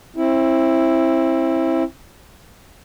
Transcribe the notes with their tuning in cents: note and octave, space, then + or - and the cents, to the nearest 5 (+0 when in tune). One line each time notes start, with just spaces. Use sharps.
C4 +30 E4 +0